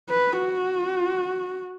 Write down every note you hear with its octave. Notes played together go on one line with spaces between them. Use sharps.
B4
F#4